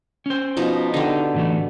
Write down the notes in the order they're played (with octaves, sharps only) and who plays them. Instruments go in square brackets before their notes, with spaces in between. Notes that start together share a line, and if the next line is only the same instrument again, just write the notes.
[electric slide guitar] C#4 C5
[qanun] B2 F3 D#4
[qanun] D3 G4 [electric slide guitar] D#4
[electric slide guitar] A2 E3 A3